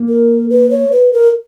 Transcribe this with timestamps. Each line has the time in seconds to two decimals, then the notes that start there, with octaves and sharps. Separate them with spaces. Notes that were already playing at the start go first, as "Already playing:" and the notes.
Already playing: A#3
0.08 A#4
0.50 B4
0.71 C#5
0.92 B4
1.13 A#4